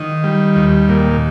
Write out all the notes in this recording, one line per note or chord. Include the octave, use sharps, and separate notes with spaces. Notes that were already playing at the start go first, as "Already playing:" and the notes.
Already playing: D#3
G3
D#2
A#2